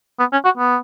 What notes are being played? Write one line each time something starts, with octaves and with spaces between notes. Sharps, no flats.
B3
C#4
F#4
B3